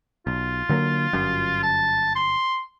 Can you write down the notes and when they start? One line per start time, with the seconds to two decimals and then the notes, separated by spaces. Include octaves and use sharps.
0.27 B1 F4
0.69 D3 F#3 A#3
1.13 G1 F#2
1.63 A5
2.16 C6